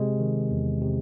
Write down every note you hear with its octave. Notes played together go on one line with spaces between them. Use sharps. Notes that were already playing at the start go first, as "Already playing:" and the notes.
Already playing: C3 G#3
D#3
E2
C3